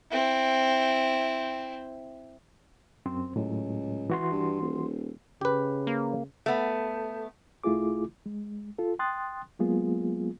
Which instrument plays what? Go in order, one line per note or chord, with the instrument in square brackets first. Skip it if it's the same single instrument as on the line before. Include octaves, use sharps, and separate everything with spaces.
[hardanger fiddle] C4 E4
[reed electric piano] F#2 C4 C5
[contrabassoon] C#2 [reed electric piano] A2 F#3
[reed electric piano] E3 F#4 C6
[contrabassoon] G2
D#1
[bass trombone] C#3 [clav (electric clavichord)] G4 B4
[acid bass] A#3
[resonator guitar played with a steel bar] A3 B3
[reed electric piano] C2 A3 E4 F4 G#4 D6
G#3
F4 A4
G5 C6 D#6 F#6 A6
F#3 G#3 A#3 B3 F4 G#4